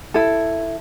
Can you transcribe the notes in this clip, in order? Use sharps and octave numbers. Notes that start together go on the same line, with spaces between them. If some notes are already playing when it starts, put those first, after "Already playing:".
E4 A4